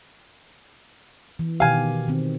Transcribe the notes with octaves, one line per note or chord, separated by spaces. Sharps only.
E3
B2 D#3 G4 F5 G#5
D#3 C4